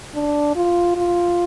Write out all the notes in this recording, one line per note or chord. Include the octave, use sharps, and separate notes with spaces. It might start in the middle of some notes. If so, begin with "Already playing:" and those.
D4
F4
F4